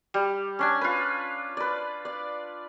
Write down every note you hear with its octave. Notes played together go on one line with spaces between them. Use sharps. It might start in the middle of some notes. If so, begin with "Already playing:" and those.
G3
C#4 D4 G#5
F4 B4
B4 D5
D5